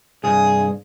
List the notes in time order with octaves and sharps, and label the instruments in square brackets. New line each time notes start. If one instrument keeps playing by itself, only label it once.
[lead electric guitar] C2 G2 [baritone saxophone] G#4